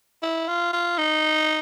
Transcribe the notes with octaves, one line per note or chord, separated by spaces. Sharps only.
E4
F4
F4
D#4